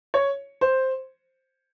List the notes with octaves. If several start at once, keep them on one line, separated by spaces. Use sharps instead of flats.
C#5
C5